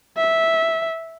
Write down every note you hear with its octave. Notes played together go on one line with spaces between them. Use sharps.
E5